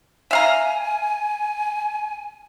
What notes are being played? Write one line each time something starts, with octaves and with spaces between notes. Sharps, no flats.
E5 F5 G#5 A#5